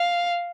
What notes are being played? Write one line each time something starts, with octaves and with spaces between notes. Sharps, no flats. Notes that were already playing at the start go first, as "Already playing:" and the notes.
Already playing: F5